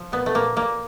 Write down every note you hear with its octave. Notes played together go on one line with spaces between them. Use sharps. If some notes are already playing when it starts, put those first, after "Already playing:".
Already playing: F3
A#2 B3
A3
A#2 A#3
A#2 A#3